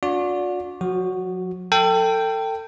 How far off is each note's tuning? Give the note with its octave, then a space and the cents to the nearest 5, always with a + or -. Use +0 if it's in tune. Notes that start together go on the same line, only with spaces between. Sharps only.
D4 -25 F#4 -45 D5 -20
F#3 -45 F#4 +0
A4 +30 G5 +0